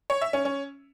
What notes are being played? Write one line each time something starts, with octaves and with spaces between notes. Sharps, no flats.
C#5
E5
C#4
C#4